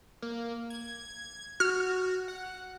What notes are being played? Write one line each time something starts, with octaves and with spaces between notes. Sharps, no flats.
A#3
G#6
F#4 F6
F#5